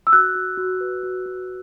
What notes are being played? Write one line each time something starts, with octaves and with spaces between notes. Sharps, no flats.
E6
F#4 F#6
F#4
F#4
B4
F#4
F#4